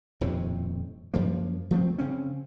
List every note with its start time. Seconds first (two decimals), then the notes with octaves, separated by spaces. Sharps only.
0.21 D#1 F2 A2 C3
1.14 F#2 F3 A#3
1.71 F3 A3 A#3 C4
1.98 C#3 C4 C#4